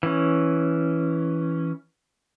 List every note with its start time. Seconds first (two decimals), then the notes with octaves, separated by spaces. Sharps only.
0.03 E3 C#4